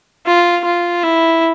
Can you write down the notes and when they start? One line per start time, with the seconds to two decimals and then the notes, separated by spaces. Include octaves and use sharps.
0.26 F4
0.65 F4
1.03 E4